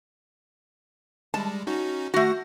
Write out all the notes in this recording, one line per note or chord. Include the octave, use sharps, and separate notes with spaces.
G3 G#3 A5
C#4 D#4 F#4
A3 F#4 F#5 A#6